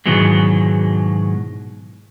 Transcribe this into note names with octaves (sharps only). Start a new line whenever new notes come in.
G#2 B2 D#3 E3 F#3 G#3